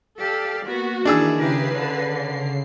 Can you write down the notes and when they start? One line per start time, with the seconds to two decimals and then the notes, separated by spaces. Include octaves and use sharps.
0.19 G4 A4 D5 F5
0.66 A#3 B3 F#4
1.05 D#3 E3 D4 E4 G#4 E6
1.37 C#3 G4 A#4 B4 C7
1.74 D3